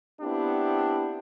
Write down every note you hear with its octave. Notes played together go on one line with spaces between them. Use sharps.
B3 C4 D4 E4 G4